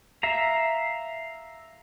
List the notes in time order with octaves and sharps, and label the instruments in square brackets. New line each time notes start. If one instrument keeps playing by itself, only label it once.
[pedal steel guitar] E5 F5 A#5